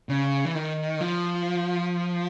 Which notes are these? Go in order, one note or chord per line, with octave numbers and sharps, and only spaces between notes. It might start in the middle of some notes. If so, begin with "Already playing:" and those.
C#3
E3
D#3
F3